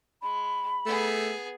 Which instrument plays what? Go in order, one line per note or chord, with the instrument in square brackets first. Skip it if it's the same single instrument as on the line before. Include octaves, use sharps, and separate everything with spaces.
[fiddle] G#3 [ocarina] B5
[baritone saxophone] A3 [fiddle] B3 G#4